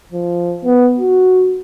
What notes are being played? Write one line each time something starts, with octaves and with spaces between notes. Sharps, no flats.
F3
B3
F#4